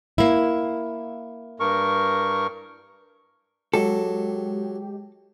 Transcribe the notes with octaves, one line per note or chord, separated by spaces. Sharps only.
A#3 E4
G2 A#4 C#6
F#3 G#3 G4 A4